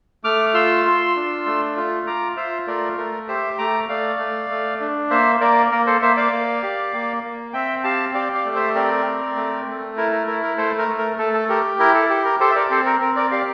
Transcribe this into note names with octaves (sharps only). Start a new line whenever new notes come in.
A3 D6 F6
F4 C6 E6
F4
D4
A3
F4
F4 A#5 D6
F4 C5 E5
A3 A#4 D5
A3 A#4
G4 C5 E5
A3 A#5 D6
A3 D5 F5
A3
A3
D4
A#3 C5 E5
A#3 A#4 D5
A#3 A#4
A4 C5
A#3 C5 E5
D5 F5
A#3
G4
A#3
A#3
C4 E5 G5
G4 F5 A5
G4 D5 F5
D5 F5
A3
C5 E5
C4 A#4 D5
C4
A3
A3
E4 A#4
A#4
E4 A#4
A#4
A3 A4 C5
A#4
A3
A#4
A3 A4
A4
G4 A#4
E4 A#4
A4
G4
A#4
G4 A4 C5
E5
A#4 D5
C4 A4 C5
A#4
C4 A#4
A#4 D5
G4 D5 F5